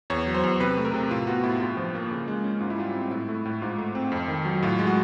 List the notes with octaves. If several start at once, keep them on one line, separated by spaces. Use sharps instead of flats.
E2 C#5
F#3
C5
E2
C3 B4
A3
A#4
C3
A2 F4
B3 F#4
A2 E4
G2 F4
F3
A#3
C#3
G#3
C#4
G#2 F4
E4
G3 F4
C4
A2 E4
A3
A2
G#2 F4
A3
C4
F2
D#3
F#3
A2 F4
G#3
F#4